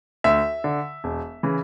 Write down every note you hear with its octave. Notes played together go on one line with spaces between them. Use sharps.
D2 E5
D3
E1
C#3 E3